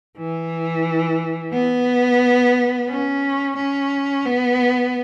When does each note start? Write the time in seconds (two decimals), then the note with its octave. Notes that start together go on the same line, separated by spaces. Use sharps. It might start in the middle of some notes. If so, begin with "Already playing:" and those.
0.18 E3
1.53 B3
2.89 C#4
3.56 C#4
4.25 B3